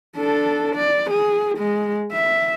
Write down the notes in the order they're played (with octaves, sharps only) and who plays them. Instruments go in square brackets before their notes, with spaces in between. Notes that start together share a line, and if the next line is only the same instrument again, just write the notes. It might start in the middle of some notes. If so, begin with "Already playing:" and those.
[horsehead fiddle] D4 A4
D5
G#4
G#3
E5